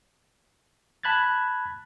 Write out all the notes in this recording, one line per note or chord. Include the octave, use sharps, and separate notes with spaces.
A5 B5 F#6 G#6 A6